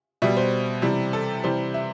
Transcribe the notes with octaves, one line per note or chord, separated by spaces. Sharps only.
B2 G3 E5
C5
C3 E3 G3
A4
C3 E3 G3 C5
E5